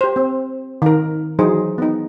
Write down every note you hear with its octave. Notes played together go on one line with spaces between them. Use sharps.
G4 C5
C4
D#3 A#4
E3 F#3 D#4 G#4 C5
B3 D#4